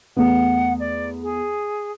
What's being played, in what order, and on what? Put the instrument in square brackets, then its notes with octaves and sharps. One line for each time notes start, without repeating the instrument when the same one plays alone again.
[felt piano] E2 A3 B3 [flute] F#5
[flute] D5
G#4